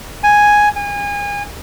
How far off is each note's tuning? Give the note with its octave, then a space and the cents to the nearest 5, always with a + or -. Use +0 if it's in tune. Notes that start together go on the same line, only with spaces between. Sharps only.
G#5 +0
G#5 -30